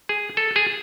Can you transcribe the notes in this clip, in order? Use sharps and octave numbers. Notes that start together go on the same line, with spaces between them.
G#4
A4
G#4